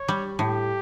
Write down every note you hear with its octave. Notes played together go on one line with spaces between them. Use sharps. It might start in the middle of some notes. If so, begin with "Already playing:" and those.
Already playing: C#5
G3
A2 G4